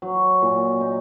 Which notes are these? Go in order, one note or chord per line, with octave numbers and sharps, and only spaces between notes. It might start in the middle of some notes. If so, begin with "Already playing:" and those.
F#3
A#2
D#4